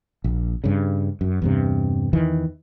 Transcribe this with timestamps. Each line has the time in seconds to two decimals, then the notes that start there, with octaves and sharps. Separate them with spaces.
0.24 A#1
0.64 G2 C#3
1.21 F#2
1.42 E2 G2 C3
2.13 E2 D#3 E3